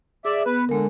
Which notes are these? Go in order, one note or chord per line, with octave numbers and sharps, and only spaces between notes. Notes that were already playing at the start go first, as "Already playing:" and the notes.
G#4 D5 E5
B3 B4
D3 G#3 A#4